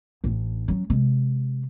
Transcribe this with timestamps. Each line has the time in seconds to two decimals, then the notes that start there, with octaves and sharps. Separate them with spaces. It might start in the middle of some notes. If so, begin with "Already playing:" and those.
0.24 A1 D4
0.68 F#3 C#4
0.90 C3 G#3